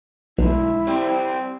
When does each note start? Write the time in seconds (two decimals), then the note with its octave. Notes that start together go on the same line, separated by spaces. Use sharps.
0.38 B1 D3 F3 G#3 E4
0.87 C4 G4 C5 D5